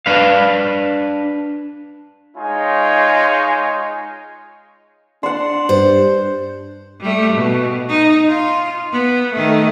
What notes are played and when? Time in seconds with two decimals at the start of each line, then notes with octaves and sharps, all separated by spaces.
0.06 D4 B4 F5
2.37 G#3 D#4 F4 C#5 G#5
5.23 D4 F#5 C6
5.69 G2 C5
7.01 G3 A3
7.33 B2
7.89 D#4
8.28 F4
8.92 B3
9.33 D#3 A3